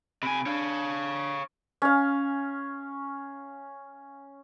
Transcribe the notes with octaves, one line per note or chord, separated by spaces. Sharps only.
C3 G#5 B5 D7
D4 C#5 F5
C#4 F5